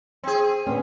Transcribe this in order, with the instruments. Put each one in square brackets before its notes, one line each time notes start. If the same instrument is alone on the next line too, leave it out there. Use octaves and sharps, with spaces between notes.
[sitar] C4 G#4
[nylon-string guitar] D3 B3 C#4